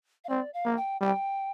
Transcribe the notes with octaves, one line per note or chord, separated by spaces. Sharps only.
F5
C4 D5
F5
A#3
G5
G3 G5